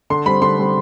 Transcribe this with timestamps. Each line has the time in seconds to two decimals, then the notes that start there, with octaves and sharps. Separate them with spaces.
0.10 D3 C6
0.26 G3 C4 B5
0.42 D3 C6
0.58 G3 C4